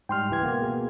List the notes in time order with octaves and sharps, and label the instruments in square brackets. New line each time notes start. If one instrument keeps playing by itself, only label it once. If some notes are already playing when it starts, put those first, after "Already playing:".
[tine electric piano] G#2 G3 [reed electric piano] G5 C6 F6
[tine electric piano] C#2 E3 G#6
B2 A#3 B3
[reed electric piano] G#4